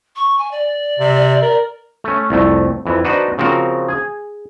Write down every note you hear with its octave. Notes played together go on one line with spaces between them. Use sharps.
C#6
G#5
D5
C3
A#4
A3 C#4
C2 F2 A3
F2 E3
D4 D#4 F#4 B4 C5
C#3 F3 C4 F#4 A#4
G#4 G#5